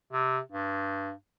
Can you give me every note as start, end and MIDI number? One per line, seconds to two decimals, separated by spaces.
0.13 0.39 48
0.52 1.11 43